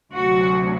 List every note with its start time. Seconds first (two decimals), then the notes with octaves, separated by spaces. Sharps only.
0.13 D2 C3 F#3 F#4